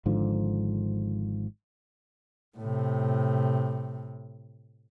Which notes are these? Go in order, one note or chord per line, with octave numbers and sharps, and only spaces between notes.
G#1 G#2 D3 F3
A2 C3